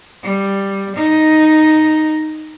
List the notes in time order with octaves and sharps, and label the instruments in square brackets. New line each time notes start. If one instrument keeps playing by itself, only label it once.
[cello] G3
D#4